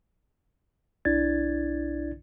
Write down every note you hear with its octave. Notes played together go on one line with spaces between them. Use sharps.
B1 D4 E4 D5 G#6 A6